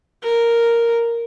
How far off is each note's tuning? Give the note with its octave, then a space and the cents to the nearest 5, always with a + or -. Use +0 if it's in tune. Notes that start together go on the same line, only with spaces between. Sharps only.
A#4 +0